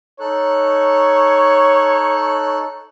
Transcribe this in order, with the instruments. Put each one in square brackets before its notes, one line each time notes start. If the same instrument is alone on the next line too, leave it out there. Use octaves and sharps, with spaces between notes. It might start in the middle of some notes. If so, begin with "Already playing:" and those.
[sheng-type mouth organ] D#4 A4 F#6 [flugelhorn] C#5